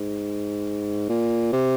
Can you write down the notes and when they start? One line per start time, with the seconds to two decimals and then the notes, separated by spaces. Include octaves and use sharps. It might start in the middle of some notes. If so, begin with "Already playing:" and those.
Already playing: G#2
1.09 A#2
1.53 C3